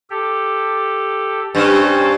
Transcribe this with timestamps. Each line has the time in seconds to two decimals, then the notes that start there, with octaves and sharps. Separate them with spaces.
0.10 G4 A4
1.55 G2 C#4 C5 A6